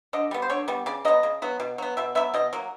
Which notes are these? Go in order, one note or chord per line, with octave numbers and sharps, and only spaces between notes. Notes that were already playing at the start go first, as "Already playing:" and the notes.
D3 D#5
G3 B3
C5
D3 C#5
G3 B3
C#3 D5
F#3 B3 D#5
C#3
F#3 B3
B2
F#3 B3
B2 E5
F#3 B3 E5
B2 D#5
F#3 A#3